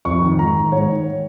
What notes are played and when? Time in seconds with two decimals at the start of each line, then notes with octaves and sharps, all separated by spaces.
0.05 F2 C#6
0.22 D#3
0.39 G#2 A#5
0.56 D#3
0.72 G#2 C#5
0.89 D#3